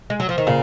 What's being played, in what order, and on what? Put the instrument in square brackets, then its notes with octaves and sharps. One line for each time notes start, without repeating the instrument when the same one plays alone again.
[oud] G#3
F#3
F3
D#3
[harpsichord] A#2 [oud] C#3